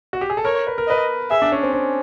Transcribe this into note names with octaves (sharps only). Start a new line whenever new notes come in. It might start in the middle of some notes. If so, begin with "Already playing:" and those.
F#4
G4
G#4
A4
A#4 C#5
B4
A#4
B4 D#5
G#4 E5
D4
C#4
C4
C#4